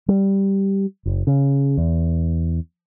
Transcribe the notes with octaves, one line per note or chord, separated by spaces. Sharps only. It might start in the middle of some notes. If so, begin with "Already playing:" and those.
G3
F#1
C#3
E2